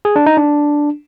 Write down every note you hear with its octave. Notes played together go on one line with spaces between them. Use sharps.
G#4
D4
D#4
D4